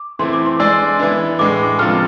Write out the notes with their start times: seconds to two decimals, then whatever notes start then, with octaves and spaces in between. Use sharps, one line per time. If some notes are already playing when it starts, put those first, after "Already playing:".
Already playing: D6
0.19 E3 A3 C4 E4 C6
0.33 D6
0.46 C6
0.59 G#3 D4 G#4 D5 E6
0.99 E3 B3 D4
1.39 A2 G#3 D4 D6
1.79 C3 F3 B3 F4 A4 F6